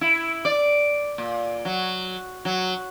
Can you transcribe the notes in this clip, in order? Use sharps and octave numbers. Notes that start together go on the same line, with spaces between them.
E4
D5
A#2
F#3
F#3